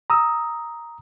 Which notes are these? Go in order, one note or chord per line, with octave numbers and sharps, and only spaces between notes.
A#5 D#6 E6